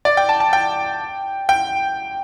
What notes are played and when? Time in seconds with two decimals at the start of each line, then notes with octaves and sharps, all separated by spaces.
0.05 D5
0.17 G5
0.29 A5
0.40 A5
0.53 G5
1.49 G5